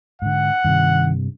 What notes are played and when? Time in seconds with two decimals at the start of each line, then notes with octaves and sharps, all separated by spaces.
0.22 G#2 D3 F#5
0.65 G2 C3 D#3